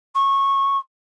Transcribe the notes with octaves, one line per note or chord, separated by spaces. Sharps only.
C#6